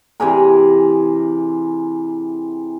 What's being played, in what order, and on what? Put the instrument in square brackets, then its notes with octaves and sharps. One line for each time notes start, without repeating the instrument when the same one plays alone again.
[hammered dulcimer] C3 E3 G#4 A#4